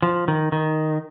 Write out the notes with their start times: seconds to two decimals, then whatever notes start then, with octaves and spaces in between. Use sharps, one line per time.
0.02 F3
0.28 D#3
0.52 D#3